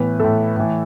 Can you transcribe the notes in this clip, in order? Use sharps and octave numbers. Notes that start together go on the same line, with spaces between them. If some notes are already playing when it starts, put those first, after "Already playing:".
Already playing: A2 E3 B3 B4
A2 E3 A3 A4
A2 E3